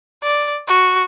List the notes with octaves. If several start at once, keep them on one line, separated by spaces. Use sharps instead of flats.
D5
F#4